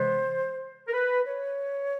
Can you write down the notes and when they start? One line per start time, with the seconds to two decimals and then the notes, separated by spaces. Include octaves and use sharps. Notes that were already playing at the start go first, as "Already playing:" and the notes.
Already playing: C3 E3 G#3 B3 C5
0.88 A#4
0.93 B4
1.25 C#5